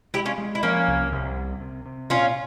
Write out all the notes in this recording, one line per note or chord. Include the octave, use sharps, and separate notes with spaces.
G#3 E4 G4
C#4 F4
G#3
E4
F3 A#3 C#4
C2
C2
C3
C3
C3
A#2 C#4 F4